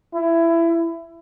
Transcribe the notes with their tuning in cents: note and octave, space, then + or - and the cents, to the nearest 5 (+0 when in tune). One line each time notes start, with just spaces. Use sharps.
E4 +20